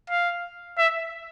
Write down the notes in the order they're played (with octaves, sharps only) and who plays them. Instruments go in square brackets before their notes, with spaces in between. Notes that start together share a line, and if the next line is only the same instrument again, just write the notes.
[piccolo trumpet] F5
E5